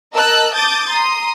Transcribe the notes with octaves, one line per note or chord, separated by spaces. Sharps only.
A#4 D#5 A5 E6 F#6
A5 D6 D#6 G6 A6
A#5 C6 D#6